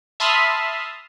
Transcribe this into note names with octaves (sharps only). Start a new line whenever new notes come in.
E5 A5 B5 C6 D#6 F6